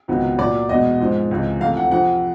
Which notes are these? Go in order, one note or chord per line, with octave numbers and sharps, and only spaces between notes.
C#2 C3 D#3 F#3 B3
A#2 F#3 A#3 D5
E2 B2 G#3 B3 D#5
G#2 F3 G#3 C4
C#2 C3 E3 G#3
F2 C3 E3 A3 F5
F#5
F2 C3 F3 F#5